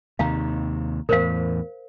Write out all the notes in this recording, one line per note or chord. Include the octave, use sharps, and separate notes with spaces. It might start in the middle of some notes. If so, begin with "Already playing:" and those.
D#2 C3 D#3 F5 A#5
E2 A2 A#4 C5 F5